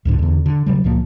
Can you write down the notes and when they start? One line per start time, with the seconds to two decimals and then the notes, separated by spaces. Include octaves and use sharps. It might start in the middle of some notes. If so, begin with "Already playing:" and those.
0.05 C#2 G#2 D3
0.19 E2 D3
0.46 D3
0.66 C#3 F#3 G3
0.84 C#2 A#2 F3 A#3